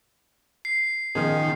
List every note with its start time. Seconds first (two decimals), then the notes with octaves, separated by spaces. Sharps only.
0.65 C7
1.15 D#3 F3 B3 C#4 D#4 G#4